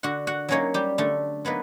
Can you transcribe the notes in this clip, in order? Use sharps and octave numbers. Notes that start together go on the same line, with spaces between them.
D3 F#4 F#5
F#4 F#5
F#3 A#3 C#4 D#4 C#5
G3 G4
D3 A3 A4
F#3 A#3 B3 D#4 B4